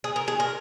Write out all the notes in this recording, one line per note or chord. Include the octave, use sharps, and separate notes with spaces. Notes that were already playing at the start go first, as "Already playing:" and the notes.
G#4
A#4
G#4
A#4